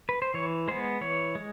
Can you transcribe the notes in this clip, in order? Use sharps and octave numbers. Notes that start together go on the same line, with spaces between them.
B4
C5
E3 C#5
G#3 B3 C5
E3 C#5
G#3